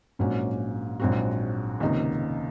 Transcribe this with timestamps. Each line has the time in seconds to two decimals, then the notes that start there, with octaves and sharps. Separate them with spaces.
0.19 A#1 G#2 F#3 A#3 C#4
1.00 A#1 G#2 F#3 C4 F#4
1.80 C#2 C3 D#3 A#3 D#4